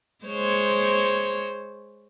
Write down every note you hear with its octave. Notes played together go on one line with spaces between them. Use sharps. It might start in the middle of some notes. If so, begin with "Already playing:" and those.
G#3 C5 C#5